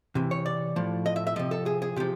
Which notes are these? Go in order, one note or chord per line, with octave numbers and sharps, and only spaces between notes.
C3 E3
C#5
D5
A2 F3
D#5
E5
E5
C3 F3 D#5
A4
G#4
G#4
C3 F3 G4